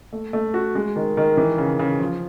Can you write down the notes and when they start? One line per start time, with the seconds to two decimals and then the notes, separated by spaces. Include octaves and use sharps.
0.13 A3
0.33 A3
0.54 F#4
0.75 G#3
0.96 D#3
1.17 D#3
1.37 E3
1.58 C#3
1.79 C#3
2.00 F3